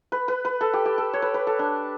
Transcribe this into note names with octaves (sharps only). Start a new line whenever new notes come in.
B4
B4
B4
A4
G4
G4
A4
C#5
B4
B4
A4
D4